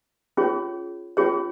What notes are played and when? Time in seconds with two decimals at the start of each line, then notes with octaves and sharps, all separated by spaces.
0.37 C#4 F4 G#4 C#5
1.17 C#4 F4 G#4 C#5